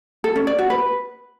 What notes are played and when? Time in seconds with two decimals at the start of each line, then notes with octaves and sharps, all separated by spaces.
0.24 A4
0.36 C#4
0.47 D5
0.59 F#4
0.70 B4